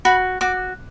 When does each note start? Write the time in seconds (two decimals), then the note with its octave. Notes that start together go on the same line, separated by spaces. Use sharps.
0.05 F#4 B5
0.41 F#4 D6